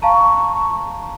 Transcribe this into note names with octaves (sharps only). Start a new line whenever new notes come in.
F5 A5 A#5 C#6